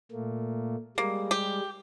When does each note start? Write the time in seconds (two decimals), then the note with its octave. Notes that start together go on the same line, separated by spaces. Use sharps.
0.11 A#2 A3 A#3
0.98 G3 G#3 A#3
1.31 G4